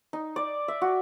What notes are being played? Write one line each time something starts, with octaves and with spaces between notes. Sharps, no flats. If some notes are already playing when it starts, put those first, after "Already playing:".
D#4
D5
E5
F#4